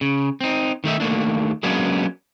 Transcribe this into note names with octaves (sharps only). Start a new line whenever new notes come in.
C#3
C4 D#4
D#3 A3 D#4 E5
D#2 A3 A#3 D4
F#3 G#3 A#3 B3 C#4 D4